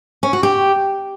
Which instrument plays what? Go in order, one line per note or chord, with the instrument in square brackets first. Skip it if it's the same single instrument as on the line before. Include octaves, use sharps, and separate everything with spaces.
[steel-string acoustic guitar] C#4
F#4
G4